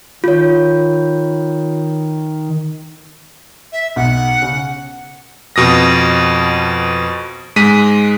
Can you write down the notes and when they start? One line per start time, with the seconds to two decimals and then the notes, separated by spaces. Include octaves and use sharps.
0.24 D#3 F4 C#5
3.72 E5
3.96 B1 B2 F#5
4.42 C#3
5.56 F2 B2 D#6 A#6
7.56 G#2 G#3 B6 D#7